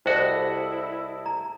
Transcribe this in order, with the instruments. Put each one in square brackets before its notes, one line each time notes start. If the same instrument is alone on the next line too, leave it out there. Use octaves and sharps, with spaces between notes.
[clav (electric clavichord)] C2 F#4 [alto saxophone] E4 [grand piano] G4 A4 D#5 [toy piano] C5
[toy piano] A#5